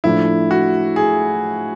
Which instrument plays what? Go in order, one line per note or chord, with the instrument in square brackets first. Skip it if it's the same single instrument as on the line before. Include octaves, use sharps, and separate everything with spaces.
[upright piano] A2 F3 A3 D4 [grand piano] E4
[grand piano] F#4
G#4